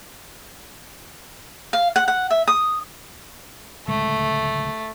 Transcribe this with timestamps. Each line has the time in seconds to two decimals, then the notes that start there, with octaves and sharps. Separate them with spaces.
1.73 F5
1.96 F#5
2.08 F#5
2.31 E5
2.48 D#6
3.88 D1 C#2 G#3 A3